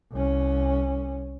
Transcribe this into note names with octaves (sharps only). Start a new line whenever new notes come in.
C2 C#4